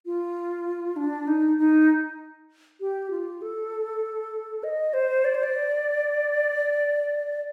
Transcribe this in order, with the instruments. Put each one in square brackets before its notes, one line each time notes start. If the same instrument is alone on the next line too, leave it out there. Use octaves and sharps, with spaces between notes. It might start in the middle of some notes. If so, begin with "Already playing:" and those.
[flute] F4
D4
D#4
D#4
G4
F4
A4
D#5
C5
D5
C5
D5